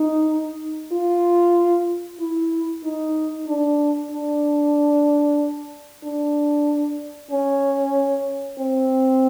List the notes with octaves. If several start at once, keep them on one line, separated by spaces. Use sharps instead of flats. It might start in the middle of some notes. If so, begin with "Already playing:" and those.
Already playing: D#4
F4
E4
D#4
D4
D4
D4
C#4
C4